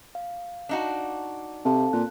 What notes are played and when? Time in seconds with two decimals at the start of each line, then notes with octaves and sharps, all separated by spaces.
0.15 F5
0.69 D4 D#4 F#4
1.65 C3 C4 A4 F5 A5
1.93 A#2 F#6